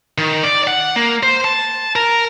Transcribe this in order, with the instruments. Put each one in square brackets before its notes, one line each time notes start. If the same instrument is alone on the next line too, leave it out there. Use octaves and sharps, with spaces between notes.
[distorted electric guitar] D#3
D5
F#5
A#3
C5
A5
A#4